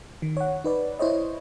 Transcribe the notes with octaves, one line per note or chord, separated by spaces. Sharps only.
D#3
C#5 F#5
D#4 B4 D5
E4 C5 C#5 D#5